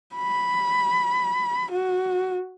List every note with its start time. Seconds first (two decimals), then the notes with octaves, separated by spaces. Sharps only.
0.15 B5
1.72 F#4